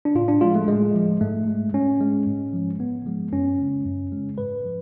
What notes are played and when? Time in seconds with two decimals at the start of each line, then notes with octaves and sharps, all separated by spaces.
0.05 D4
0.15 A2 F4
0.28 D4
0.41 F3 G#3 F4
0.55 A3
0.67 A2 G#3
0.95 F3 G#3
1.21 G#2 A3
1.48 G#3
1.73 G#2 C#4
2.01 G#3
2.27 G#2
2.53 F3 G#3
2.80 G#2 B3
3.06 F3 G#3
3.32 F#2 C#4
3.58 C#3 G#3
3.85 F#2
4.12 C#3 G#3
4.38 G#2 B4
4.65 F3